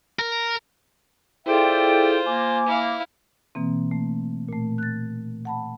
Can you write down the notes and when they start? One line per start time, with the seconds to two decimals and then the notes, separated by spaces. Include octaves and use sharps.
0.19 A#4
1.46 E4 F4 G#4 A4 C5 D5 E5 G5
2.26 A#3 G#5 D6
2.66 E4 F5
3.55 B2 E3 A#3 C4
3.91 A3
4.49 A#2 A3
4.78 F#6 A6
5.45 F#5 A5 B5